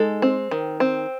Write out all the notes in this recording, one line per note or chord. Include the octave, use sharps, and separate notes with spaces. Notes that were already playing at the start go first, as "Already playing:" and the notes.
Already playing: G#3 D#4 A4
C4
D#3
C4